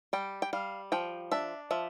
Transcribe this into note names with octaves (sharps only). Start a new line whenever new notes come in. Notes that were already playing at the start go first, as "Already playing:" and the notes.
G3 G5
G5
G3 F5
F3 G5
D4 E5
F3 E5